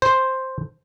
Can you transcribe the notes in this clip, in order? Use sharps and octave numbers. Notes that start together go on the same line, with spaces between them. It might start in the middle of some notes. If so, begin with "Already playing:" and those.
C5